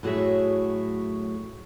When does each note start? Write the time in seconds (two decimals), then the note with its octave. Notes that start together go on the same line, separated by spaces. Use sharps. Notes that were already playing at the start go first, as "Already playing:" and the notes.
0.03 A2 F#3 F#4 G#4 C#5 E5